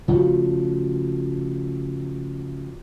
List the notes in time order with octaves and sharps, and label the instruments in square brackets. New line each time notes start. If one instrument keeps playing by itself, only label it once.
[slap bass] C#3 F3 A3 [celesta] F4 F#4